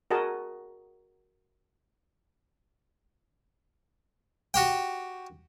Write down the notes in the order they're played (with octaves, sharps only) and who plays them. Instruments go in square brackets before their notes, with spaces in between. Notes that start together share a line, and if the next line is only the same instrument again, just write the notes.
[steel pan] F#4 G#4 A#4 D#5 A5
[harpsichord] F#4 G4 G5